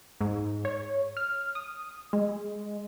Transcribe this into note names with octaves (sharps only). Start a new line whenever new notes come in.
G#2
C#5
F6
D#6
G#3